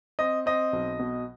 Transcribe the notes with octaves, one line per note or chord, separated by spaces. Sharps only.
C4 D#5
C4 D#5
B1
B2